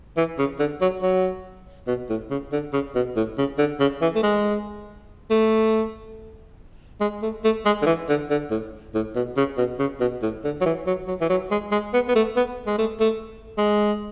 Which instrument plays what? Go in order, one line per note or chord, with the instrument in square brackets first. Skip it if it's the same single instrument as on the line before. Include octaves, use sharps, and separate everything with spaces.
[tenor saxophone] E3
C#3
D3
F#3
F#3
B2
A2
C#3
D3
C#3
B2
A2
C#3
D3
C#3
E3
A3
G#3
A3
G#3
A3
A3
G#3
D3
E3
D3
D3
A2
A2
B2
C#3
B2
C#3
B2
A2
D3
F#3
E3
F#3
F#3
E3
F#3
G#3
G#3
B3
B3
A3
B3
G#3
A3
A3
G#3